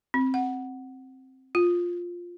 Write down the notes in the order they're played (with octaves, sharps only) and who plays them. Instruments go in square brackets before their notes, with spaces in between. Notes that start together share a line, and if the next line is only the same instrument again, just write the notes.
[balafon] C4
F#5
F4